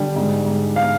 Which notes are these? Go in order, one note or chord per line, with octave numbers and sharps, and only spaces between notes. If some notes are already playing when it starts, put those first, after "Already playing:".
Already playing: D3 G3
G#2
G#2
F5